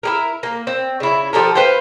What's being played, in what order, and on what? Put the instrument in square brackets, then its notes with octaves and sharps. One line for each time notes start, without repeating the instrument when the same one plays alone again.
[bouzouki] E4 G#4 A#4
A#3
C4
C#3 E4
F3 G4 A4 A#4
B4 C5 F5 G5